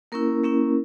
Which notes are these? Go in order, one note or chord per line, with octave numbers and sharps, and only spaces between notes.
A#3 C#4 E4 A#4
A#3 C#4 E4